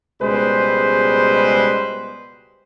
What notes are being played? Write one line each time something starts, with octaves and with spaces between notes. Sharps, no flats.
C#2 B2 G3 G#3 B4 C5